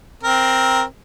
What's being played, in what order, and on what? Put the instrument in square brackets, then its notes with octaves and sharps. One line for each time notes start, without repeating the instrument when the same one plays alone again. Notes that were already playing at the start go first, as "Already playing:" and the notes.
[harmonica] C4 A#4